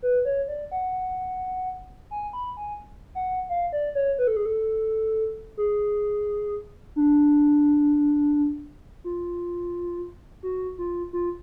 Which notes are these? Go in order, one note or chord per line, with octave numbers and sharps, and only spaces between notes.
B4
C#5
D5
F#5
G#5
B5
G#5
F#5
F5
D5
C#5
B4
A4
G#4
A4
G#4
D4
F4
F#4
F4
F4